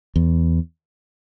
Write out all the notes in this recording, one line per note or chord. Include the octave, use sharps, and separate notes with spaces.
E2